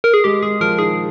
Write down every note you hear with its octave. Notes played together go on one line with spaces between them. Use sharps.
A#4
G#4
G#3 G4
G#3 G#4
F3 A#4
D#3 G#4